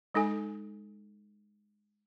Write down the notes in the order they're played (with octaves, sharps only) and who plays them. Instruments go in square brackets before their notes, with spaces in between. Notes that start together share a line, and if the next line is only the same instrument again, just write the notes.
[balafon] G#3 D#4 A4 G#5